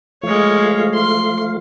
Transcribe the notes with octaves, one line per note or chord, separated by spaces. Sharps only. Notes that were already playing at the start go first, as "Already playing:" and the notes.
F3 G#3 A3 C#5 F5
C6